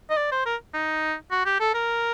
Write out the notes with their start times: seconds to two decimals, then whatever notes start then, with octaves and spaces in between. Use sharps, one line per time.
0.10 D#5
0.17 D5
0.32 C5
0.46 A#4
0.74 D#4
1.31 F#4
1.46 G4
1.60 A4
1.74 A#4